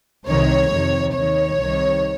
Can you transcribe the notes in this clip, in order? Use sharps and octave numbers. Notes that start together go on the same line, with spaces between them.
C2 C3 D#3 C#5
F2 C3 D#3
D#2 D#3 C#5
C2 C3 D#3